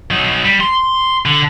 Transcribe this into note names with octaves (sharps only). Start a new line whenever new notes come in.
F#3 D#4
G3
C6
D3